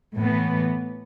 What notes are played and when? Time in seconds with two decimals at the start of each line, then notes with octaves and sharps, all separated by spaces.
0.16 A2 E3 B3